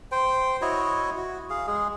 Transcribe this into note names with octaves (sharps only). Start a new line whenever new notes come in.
C5 G5
E4 F#4 C#5 D#5
F#4
G#4 F5
G#3 G#4